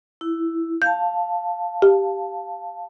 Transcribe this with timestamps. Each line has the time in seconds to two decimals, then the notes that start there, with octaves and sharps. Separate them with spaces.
0.21 E4
0.82 F5 A5 G6
1.82 G4